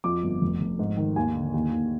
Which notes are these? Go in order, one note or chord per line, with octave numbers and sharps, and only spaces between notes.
F2 D6
G1
F1
F1
G#2
D#3
D#2 G#5
D3
D#2
D#2